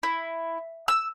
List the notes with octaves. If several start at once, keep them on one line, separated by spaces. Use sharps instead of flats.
E4
E6